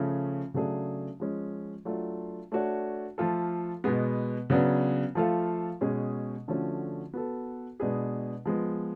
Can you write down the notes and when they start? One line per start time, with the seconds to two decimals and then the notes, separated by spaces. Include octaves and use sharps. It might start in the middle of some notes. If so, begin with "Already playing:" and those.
Already playing: C#3 F3 A3 C#4
0.54 C#3 F#3 A3 D4 G#4
1.20 F3 G#3 C#4
1.85 F#3 A3 D4 F4
2.52 A3 D4 F#4 C#5
3.18 F3 A3 F4 A4
3.84 B2 G#3 B3
4.50 C#3 F#3 B3 D4
5.15 F3 A3 F4 A4 F5
5.81 B2 G#3 C#4 G#4
6.48 D3 F3 A3 C#4 F#4
7.14 B3 F#4 A4
7.80 B2 G#3 D4 G#4 B4
8.46 F3 G#3 B3